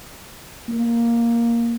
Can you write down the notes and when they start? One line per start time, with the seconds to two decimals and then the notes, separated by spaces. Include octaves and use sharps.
0.69 A#3